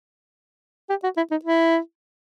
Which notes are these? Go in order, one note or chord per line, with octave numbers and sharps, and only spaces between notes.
G4
F#4
E4
D#4
E4